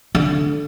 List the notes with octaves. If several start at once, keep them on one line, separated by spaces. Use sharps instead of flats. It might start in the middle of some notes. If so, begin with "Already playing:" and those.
D3